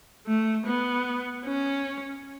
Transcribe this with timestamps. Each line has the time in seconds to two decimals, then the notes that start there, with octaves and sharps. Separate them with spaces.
0.27 A3
0.67 B3
1.45 C#4